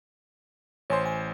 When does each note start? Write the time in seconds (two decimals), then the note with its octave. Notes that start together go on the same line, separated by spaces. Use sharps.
0.90 A1 C5 C#5 G#5 C6
1.06 G#5